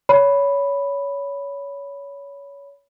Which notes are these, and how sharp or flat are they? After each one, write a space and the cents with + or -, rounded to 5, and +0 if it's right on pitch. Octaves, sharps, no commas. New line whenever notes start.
C#5 +20 B5 +0